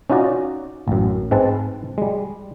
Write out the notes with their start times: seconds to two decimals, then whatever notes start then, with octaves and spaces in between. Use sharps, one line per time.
0.10 C#4 D#4 F4 F#4 D5 D#5
0.88 A1 F#2
1.31 G#2 G#3 C4 B4 A5
1.98 G3 G#3